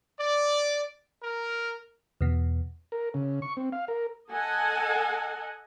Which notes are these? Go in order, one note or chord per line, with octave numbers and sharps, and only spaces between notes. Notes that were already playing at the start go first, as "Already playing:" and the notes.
D5
A#4
E2 B2
A#4
C#3
C#6
C4
F5
A#4
A4 D#5 F#5 G#5